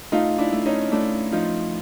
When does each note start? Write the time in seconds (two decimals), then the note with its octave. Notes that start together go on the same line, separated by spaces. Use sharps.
0.12 A3 D#4 F4
0.38 D4 E4
0.52 A3
0.66 C#4 D#4
0.92 A3 D4 E4
1.32 F3 D#4 F4